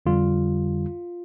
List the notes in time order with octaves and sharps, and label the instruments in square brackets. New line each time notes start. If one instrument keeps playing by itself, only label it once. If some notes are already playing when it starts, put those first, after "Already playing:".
[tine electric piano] F2 D3 G3 F4